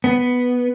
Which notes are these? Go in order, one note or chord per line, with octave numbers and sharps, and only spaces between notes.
B3